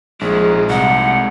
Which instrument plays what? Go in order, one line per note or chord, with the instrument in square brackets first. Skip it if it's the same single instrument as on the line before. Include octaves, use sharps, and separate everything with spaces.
[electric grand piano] A#1 [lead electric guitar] G#3 A#3 [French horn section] D#4 [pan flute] G#4
[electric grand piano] C2 [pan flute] F#5